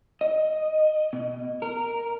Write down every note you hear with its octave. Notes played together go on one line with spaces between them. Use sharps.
D#5
B2
A#4